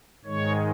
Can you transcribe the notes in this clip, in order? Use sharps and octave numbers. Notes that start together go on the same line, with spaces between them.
G#2 D#3 G#3 C#5